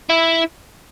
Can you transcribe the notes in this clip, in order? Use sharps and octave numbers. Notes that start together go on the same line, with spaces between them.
E4